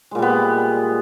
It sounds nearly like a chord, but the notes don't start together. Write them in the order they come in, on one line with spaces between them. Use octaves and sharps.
G#3 A#2 G3 B3